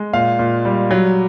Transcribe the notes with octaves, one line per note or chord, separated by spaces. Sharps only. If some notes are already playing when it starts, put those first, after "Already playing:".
Already playing: G#3
A#2 F5
A#2
G3
F#3